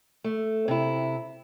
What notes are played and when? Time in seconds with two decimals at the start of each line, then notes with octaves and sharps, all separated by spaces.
0.24 A3
0.68 C3 E4